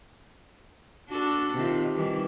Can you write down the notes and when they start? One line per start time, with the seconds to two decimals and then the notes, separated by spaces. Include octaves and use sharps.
1.09 D4 F#4 A4
1.52 C3 D#3 F4
1.95 D#3 E3 G3